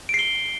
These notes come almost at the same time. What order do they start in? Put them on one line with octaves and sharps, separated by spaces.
D7 C7 G7